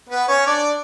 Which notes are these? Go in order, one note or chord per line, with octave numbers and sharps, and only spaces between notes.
B3 B4
C#4 C#5
D4 D5